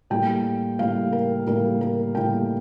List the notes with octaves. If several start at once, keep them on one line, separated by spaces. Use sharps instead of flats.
A2 G3 A#3 G5
A2 G3 A#3 F5
A#4
A2 G3 A#3 A#4
A#4
A2 G3 A#3 G5